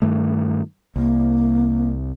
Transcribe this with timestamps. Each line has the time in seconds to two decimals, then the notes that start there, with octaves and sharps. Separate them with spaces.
0.02 G2 D#3 A3
0.96 C2 A#3